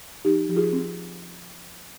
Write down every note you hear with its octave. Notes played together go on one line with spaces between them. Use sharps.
F3 D#4 G4
F3 G4
F4 G#4
C4